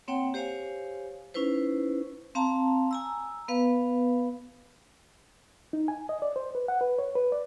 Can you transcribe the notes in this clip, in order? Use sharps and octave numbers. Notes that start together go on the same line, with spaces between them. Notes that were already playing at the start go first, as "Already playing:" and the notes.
A#3 C4 C#5 F#5 G5
G4 C5 C#5 F5 G#5
C#4 D#4 E4 B4 C5
C4 F5 A5 A#5
G#5 A#5 E6
B3 B4 F5
D#4
G#5
D#5
D5
C5
B4
F#5
B4
C#5
B4
D5